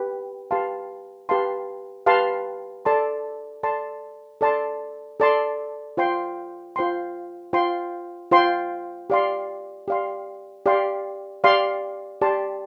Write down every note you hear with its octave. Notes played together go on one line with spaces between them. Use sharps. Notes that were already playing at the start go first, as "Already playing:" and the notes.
Already playing: G4 B4
G4 B4 F5 A5 C6
G4 B4 F5 A5 C6
G4 B4 F5 A5 C6
A4 D5 A5 C6
A4 D5 A5 C6
A4 D5 A5 C6
A4 D5 A5 C6
F4 C5 G5 C6
F4 C5 G5 C6
F4 C5 G5 C6
F4 C5 G5 C6
G4 D5 F5 C6
G4 D5 F5 C6
G4 D5 F5 C6
G4 D5 F5 C6
G4 D5 A5 C6